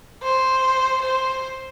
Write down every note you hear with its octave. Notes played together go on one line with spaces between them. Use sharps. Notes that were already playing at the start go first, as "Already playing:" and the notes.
C5
C5